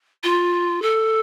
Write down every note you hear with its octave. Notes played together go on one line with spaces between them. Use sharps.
F4
A4